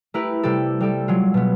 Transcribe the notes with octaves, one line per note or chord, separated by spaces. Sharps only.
A3 E4 G4 A#4 B4
C3 G3 G4 A4
G3 G4 A4
F#3 G#3 F4
B2 B3